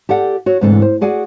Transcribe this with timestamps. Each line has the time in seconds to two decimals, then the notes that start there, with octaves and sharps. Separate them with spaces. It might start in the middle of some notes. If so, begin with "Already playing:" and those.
0.09 G4 A4 D5 F#5
0.46 F#4 C#5
0.61 D2 G#2 C3 E3 D4 A4
0.82 C5
1.01 F#4 G#4 D5 F#5 G#5